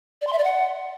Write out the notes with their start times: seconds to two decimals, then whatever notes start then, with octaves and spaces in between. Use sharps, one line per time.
0.21 D5
0.27 C6
0.33 E5
0.38 D5
0.44 F#5